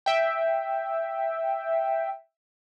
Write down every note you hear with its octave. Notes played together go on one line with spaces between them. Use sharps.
E5 G5